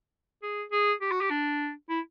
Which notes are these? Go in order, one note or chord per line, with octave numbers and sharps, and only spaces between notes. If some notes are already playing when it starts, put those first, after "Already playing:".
G#4
G#4
G4
F#4
G4
D4
E4